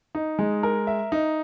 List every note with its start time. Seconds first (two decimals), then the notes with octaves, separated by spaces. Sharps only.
0.15 D#4
0.39 G#3
0.63 A#4
0.87 E5
1.12 D#4